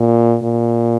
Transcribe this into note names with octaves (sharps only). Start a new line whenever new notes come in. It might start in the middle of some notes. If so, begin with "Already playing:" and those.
Already playing: A#2
A#2